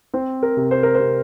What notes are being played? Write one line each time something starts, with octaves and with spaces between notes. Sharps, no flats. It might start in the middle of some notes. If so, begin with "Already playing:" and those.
C4 C5
A#4
C3
C5
A#4
C3 C5